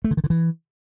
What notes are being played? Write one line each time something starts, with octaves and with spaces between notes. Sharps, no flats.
A3
D3
D#3
D3
E3